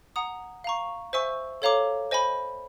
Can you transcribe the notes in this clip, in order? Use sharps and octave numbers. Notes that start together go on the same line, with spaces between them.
F#5 A#5 D#6
F5 A#5 C#6
C5 E5 G#5 C#6 E6
A4 C#5 F5 A#5 D6
C5 D#5 G#5 B5